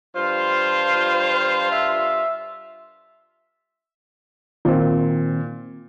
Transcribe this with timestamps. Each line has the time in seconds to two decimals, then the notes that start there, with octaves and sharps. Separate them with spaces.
0.16 G2 F4 C5
1.72 E5
4.65 A#2 D#3 C4